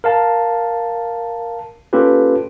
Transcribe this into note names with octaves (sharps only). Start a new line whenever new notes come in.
A#4 F5 A5
A#3 C#4 F4 G4 A4 B4